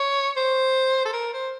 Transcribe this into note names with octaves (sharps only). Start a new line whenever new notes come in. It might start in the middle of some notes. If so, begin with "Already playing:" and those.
Already playing: C#5
C5
A4
A#4
C5